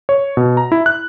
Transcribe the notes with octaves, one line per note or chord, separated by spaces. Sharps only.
C#5
B2
A#5
E4
F#6